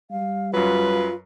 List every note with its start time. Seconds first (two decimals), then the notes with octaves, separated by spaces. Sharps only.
0.11 G3 F5
0.53 F#2 F#3 F4 B4